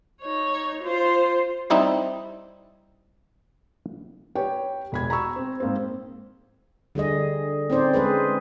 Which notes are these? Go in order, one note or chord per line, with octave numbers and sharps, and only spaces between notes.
D#4 C#5
F4 C5
G3 C4 D#4 E4 G4
G4 B4 C#5 G5
E1 B5 G#6
A#5 B5 C#6 E6
C4
G#2 A#3 C4
D3 G3 G#4 D#5
C4 C#4 D#4 C5 D5
G#3 G#4 B4 C5